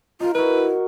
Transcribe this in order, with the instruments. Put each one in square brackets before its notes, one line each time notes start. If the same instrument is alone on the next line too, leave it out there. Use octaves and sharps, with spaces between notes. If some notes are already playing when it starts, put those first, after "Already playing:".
[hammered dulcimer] D#4 A#4 [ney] F4
[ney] E4 [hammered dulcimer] F#4 A#4 [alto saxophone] B4